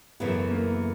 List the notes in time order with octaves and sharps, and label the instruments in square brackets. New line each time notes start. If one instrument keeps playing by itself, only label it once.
[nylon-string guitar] F#2 C#3 E3 A3 [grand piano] B3
[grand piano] A#3